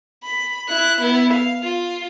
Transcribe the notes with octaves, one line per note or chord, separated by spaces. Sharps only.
B5
E4 F#6
B3 E4
F5
F4